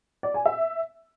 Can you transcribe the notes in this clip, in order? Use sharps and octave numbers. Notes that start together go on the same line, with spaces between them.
D5
G#5
E5